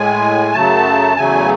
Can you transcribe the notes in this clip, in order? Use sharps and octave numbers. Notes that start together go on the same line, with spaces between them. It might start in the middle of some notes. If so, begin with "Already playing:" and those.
Already playing: A2 G#3 G#5
F#2 C#3 F#3 A3 A5
E2 C#3 F#3 A3 G#5